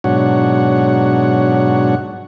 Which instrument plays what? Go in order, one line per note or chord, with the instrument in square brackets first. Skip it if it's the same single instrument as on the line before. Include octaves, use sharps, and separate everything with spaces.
[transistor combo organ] G#2 B2 F#3 D4 C#5 F#5